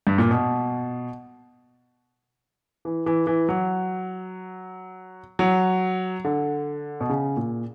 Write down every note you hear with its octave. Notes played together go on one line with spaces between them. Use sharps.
G2
A#2
B2
E3
E3
E3
F#3
F#3
D3
B2
C#3
A#2